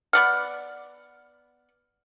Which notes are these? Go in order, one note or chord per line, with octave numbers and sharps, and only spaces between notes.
B3 D5 F#5 F6